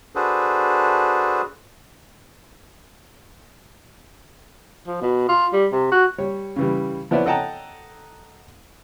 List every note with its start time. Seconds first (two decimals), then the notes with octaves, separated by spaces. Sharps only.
0.15 D4 F#4 G#4 A4 B4 C5
4.87 F3
5.02 B2
5.29 F4
5.53 G3
5.72 C3
5.92 F#4
6.18 G3 C#5
6.56 C#3 E3 G3
7.11 F3 B3 E4 C#5 D5 E5
7.26 A4 D#5 F#5 G5 A5 A#5